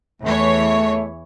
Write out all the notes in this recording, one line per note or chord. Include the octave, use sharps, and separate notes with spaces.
E2 E3 A3 C#5